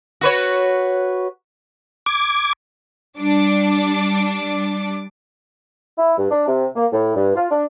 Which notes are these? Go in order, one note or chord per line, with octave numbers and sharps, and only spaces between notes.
F#4 B4 C#5
D6 G#6
G3 D4 D6
E4
G2
D4
C3
A#3
A2
G2
F4
D4